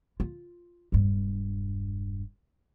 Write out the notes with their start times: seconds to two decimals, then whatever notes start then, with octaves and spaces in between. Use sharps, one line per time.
0.20 F4
0.92 E1 G2